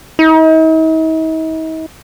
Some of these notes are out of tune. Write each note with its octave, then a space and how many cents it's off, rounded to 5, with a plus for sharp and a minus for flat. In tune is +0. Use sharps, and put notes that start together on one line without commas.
D#4 +45